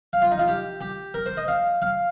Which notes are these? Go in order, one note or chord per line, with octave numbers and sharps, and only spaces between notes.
F5
F4
D#4
F4
G4
G4
A#4
C5
D#5
F5
F5